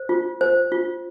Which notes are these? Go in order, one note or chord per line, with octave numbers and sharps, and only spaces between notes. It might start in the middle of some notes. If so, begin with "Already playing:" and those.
Already playing: C5
F4
C5
F4